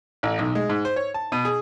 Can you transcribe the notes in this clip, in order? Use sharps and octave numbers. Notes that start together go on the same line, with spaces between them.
A1
B1
G#3
G#2
C5
C#5
A5
B2
G#4